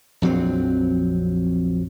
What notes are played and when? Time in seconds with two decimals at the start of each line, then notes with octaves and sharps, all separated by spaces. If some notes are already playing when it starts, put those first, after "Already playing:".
0.22 A#1 F2 F#3 C4